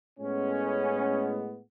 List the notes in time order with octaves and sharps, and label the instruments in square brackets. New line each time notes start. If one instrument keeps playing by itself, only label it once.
[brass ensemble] A2 G#3 B3 C#4